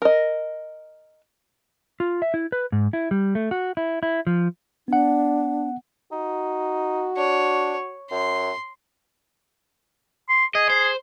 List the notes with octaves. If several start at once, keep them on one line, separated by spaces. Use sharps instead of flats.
A#4 D#5
F4
E5
E4
B4
G#2
E4
G3
A3
F#4
E4
E4
F3
B3 D4 F#5
D#4 F#4
D4 C#5
F#2 C6
C6
G#4 D#5
C5